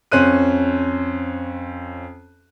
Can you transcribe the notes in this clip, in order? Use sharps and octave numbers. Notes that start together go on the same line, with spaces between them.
F2 C#4 C5 F#6 D#7